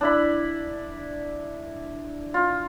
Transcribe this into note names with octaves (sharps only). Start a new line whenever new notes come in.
D4 E4 B5
F4